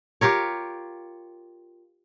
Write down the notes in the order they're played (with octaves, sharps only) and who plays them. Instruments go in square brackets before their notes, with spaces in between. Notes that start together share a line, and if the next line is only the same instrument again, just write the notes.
[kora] F4 G4 A#4 C#5